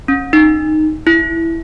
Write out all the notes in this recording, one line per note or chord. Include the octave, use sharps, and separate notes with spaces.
C#4
D#4
E4